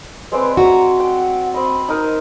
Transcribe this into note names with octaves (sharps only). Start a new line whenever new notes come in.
G#3 C4 B4 D5
F#4 E5 A#5
F#5 G5
C4 D#5 B5
D#4 A#4